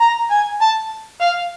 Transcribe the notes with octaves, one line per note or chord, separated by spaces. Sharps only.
A#5
G#5
A5
F5